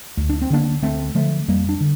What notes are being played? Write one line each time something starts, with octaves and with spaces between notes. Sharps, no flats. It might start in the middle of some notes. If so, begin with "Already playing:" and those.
D2
D4
C4
D3 A#3 D4
D2 A3 C4
D3 F3 A3
F2 G3 A#3
D4
D3